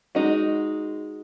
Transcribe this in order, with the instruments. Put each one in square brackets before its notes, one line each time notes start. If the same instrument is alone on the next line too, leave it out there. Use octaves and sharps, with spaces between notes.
[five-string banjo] G#3 D#4 F#4